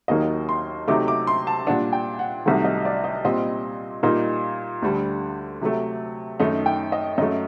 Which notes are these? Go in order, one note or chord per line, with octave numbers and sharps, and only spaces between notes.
D#2 D#3 F#3 A#3 D#5
C6
C3 F#3 A3 D#4 D6
D6
C6
A5
A#2 G3 D4 F#5
G5
F#5
C2 C3 D#3 F#3 A3 F#5
D#5
D5
D#5
A#2 G3 C4 D#5
A#2 G3 A#3 D#4
D2 D3 G3
C3 F#3 A3
F#2 D#3 A3 D#4
G5
D#5
F#2 F#3 A3 D#5